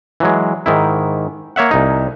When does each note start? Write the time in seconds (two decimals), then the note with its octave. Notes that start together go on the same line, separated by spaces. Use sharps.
0.20 E3 F#3 G#3
0.66 G#2 D#3 E4
1.56 A#3 C#5 E5 F#5
1.71 C2 D#4